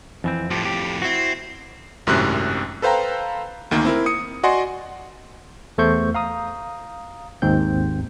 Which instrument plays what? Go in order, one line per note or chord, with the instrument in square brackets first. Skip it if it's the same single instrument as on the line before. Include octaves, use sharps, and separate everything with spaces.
[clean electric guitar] F2 E3 C4
[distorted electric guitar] F2 A2 [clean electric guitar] F3 G4
[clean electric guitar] G4
[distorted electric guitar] C4 [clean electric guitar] E4 F#4
[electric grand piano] G#1 F#2 A2 C3 F#6
A4 B4 C5 F5 G5 A#5
D2 D#3 A#3
C4 E4 A#4
D#6 C#7
F#4 D5 D#5 F#5 G#5 C6
[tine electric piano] E2 A3 A4 C5 C#6 G6
F5 A#5 D#6
G#1 D#2 G#2 C4 G6